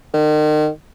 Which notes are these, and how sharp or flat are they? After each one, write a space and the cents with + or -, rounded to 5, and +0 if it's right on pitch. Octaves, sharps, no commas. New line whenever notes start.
D#3 -35